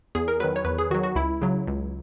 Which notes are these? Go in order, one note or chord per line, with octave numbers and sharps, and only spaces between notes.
E2 G#4
A#4
D#3 F#3 B4
C#5
E2 B4
G#4
D#3 F#3 F#4
F#4
C#2 E4
C#3 F#3
C#2